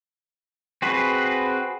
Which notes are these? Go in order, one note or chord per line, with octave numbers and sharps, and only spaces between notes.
C4 F#4 G#4 B4